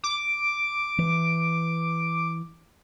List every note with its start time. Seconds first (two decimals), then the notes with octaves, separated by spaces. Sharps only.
0.04 D6
0.98 E3